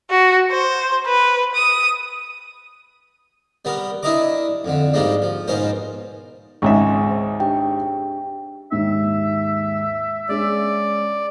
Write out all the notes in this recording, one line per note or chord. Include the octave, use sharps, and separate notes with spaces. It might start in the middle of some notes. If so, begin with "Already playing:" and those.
F#4
C5
B4
D#6
G3 B3 A#4
D4 E4 A#4 D#5 A#5 D6
F2 D3
G#2 G3 G#3 A#3 D4
F3
G#2 B2 C#4 A#4 C5
G#1 C#2 E5 G#5 C#6
C5
D4 G4 G5
D#2 G#2 D#3 E5
G#3 C#4 D5